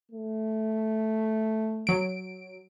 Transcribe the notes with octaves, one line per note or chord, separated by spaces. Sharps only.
A3
F#3 D7